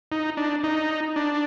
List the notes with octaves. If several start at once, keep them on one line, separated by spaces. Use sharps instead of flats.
D#4
D4
D#4
D4